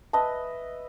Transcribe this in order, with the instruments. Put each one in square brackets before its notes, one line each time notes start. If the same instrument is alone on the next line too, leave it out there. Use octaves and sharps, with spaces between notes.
[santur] B4 D#5 E5 [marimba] A5